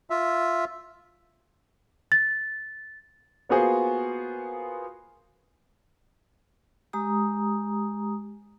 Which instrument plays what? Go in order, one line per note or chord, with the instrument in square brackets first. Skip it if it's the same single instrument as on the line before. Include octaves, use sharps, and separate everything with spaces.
[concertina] F4 E5
[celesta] A6
[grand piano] A#3 B3 F4 F#4 G#4 C5
[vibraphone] G#3 G4 A#5 D#6